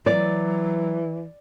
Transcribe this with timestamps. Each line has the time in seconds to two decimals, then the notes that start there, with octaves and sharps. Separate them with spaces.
0.06 E3 F#3 D5